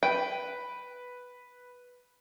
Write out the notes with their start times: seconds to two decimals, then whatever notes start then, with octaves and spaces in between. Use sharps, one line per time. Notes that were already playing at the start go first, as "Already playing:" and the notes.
0.03 B4 G5